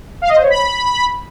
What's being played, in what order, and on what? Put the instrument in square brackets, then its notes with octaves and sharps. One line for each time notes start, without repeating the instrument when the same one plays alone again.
[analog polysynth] F5
D#5
C5
C#5
B5